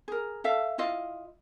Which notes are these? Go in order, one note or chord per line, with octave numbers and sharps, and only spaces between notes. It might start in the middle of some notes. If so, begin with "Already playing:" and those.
G#4 A#4
A4 E5 F5
E4 F4 D#5 F5